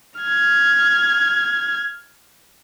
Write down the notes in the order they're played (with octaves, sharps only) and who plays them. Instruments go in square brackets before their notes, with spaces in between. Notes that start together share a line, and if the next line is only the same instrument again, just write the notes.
[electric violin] F6 G#6